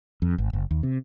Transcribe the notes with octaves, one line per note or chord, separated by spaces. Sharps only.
F2
G#1
F#1
D#2
C3